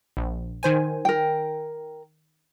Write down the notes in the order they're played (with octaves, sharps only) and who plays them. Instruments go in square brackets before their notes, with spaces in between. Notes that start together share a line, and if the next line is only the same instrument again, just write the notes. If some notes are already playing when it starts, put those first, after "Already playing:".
[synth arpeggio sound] A#1
D#3 C5 G#5
[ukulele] A#4 G5